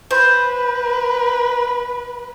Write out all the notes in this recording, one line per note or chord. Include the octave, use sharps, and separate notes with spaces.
B4 C5